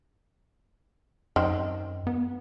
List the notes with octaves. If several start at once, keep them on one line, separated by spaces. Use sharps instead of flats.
F#2 D#3 C4
B3